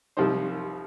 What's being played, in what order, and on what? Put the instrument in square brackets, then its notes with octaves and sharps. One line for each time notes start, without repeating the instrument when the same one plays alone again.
[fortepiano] C2 C3 F3 D#4 C5